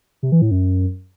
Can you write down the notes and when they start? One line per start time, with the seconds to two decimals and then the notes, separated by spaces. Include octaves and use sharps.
0.23 C3
0.32 E3
0.42 A2
0.51 F#2